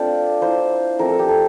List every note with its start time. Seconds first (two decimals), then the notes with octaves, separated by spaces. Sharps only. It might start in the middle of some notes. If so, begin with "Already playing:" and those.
Already playing: A3 C4 D4 F4 C5 D5
0.42 A#3 E4 C5
0.99 F3 A3 C4 A#4
1.09 A4
1.19 G4
1.28 A4